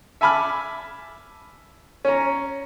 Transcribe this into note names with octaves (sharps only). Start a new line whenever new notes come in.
E5 G#5 A5 B5 D6 F6
C#4 A#5